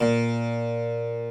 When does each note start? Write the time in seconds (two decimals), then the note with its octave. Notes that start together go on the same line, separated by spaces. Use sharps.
0.01 A#2